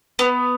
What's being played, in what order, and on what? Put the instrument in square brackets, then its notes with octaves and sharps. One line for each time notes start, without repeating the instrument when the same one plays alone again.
[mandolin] B3